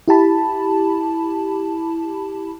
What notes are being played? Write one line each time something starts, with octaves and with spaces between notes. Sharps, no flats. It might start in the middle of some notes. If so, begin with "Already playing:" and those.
E4 G4 A5 B5